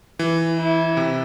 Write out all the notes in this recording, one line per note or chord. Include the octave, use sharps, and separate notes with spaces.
E3
E4
C3